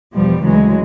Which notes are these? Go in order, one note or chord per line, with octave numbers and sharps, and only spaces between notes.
E2 B2 F3 G3
D2 C#3 E3 F#3 G#3